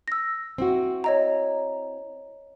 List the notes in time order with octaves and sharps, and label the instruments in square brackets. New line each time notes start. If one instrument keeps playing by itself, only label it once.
[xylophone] E6 A#6
[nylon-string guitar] C4 E4 F#4
[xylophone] C#5 D#5 A#5